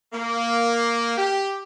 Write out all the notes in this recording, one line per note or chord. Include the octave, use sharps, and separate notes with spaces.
A#3
G4